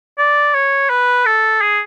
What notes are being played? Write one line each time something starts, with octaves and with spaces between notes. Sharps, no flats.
D5
C#5
B4
A4
G#4